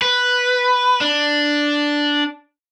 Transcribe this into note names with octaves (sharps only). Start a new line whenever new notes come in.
B4
D4